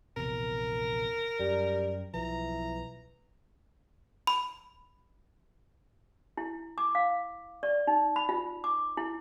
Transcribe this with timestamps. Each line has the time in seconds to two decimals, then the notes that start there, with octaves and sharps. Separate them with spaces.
0.17 A#1 E2 C3 A#4
1.39 F#2 G3
2.14 B1 E3 F3 A#5
4.27 B5
6.37 E4
6.78 D6
6.95 F5
7.63 D5
7.87 D#4
8.16 B5
8.29 F4
8.64 D6
8.97 E4